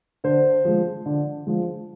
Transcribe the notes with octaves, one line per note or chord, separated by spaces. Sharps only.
D3 C5
F3 G#3
D3
F3 G#3